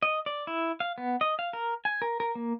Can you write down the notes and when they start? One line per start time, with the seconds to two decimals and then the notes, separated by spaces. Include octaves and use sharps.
0.03 D#5
0.26 D5
0.47 E4
0.80 F5
0.98 B3
1.21 D#5
1.39 F5
1.53 A#4
1.85 G#5
2.02 A#4
2.20 A#4
2.35 A#3